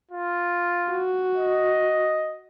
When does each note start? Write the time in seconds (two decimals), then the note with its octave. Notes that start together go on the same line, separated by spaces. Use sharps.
0.11 F4
0.92 F#4
1.36 D#5